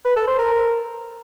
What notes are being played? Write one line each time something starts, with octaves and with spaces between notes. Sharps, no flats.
B4
A4
C5
A#4